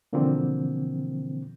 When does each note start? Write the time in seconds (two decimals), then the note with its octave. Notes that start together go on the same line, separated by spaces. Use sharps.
0.13 B2 D3 E3 F3 A#3 C4